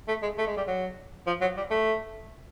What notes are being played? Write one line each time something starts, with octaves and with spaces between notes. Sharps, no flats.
A3
G#3
A3
G#3
G3
F#3
F3
F#3
G3
A3